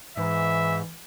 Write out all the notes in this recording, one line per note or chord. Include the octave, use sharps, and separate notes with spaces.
G#2 E3 E5